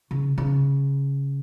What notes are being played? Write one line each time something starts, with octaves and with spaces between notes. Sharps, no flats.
C#3
C#3